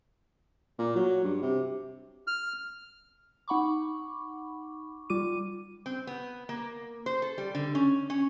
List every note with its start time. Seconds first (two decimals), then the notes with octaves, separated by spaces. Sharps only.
0.79 A#2
0.95 F#3
1.24 G2
1.42 C3
2.27 F6
3.48 D#4 F#5 B5 C#6 D6
5.10 G3 F4 D6 D#7
5.86 C4
6.07 B3
6.49 A#3
7.06 C5
7.22 A4
7.38 G3
7.55 D3
7.75 C#4
8.10 C#4